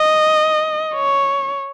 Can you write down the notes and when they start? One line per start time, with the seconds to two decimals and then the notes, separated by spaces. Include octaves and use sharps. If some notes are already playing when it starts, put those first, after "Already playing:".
Already playing: D#5
0.95 C#5